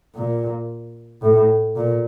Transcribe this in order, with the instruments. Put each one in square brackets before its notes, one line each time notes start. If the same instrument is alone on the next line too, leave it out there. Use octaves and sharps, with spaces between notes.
[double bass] A#2
A2
A#2